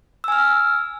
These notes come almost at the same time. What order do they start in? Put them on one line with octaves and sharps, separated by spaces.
E6 G#5 F6